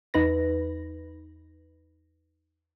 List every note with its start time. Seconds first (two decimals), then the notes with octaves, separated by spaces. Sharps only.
0.14 E2 D#4 B4 A#6